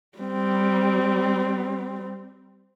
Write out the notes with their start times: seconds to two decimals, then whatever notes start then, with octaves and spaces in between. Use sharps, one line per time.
0.18 G3 C4